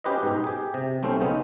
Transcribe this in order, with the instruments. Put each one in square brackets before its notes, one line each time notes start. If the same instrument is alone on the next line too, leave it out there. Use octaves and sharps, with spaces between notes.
[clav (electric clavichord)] C#4 F#4 G4 B4 C5 D#5
G#2 B2 D#4
G4 G#4
C3
B1 A3 C4 C#4 C5
C#3 B3 C#4 D#4